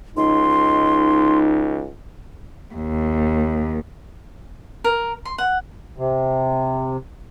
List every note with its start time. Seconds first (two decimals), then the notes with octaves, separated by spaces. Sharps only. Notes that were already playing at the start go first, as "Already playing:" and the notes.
0.17 C#2 D#4 C6
2.75 D#2
4.84 A#4
5.25 C6
5.38 F#5
5.98 C3